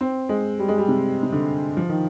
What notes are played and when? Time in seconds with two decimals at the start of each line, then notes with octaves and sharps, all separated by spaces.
0.01 C4
0.29 G#3
0.59 G3
0.68 G#3
0.78 G3
0.88 C3
1.23 C3
1.32 D3
1.77 F3
1.89 D#3